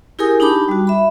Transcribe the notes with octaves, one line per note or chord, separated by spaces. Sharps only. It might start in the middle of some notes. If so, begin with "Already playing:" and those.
E4 G4 G#4 A#4 G#5 D#6
D4 D#4 G4 A5 B5 D6
G3 F#4
E5 B5